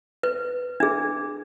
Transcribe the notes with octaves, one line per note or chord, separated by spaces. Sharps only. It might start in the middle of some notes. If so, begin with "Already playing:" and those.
B4
D4 G#4